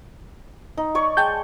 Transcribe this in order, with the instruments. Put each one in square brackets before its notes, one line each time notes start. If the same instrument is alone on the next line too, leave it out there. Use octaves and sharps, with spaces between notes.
[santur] D#4
C#5 D5 C#6
[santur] G#3 [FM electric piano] G5 A5 G6